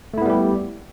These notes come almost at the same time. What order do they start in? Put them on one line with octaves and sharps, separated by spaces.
A3 E4 B3 G3 G4